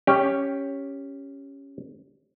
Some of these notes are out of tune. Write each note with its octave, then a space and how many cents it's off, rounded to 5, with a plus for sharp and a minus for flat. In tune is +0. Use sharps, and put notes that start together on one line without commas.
C#4 +0 G4 +10